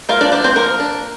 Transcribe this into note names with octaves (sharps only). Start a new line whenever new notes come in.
A#3 F4 F5
D4 D5
F3 D4 D5
C4 C5
F3 A#3 A#4
D4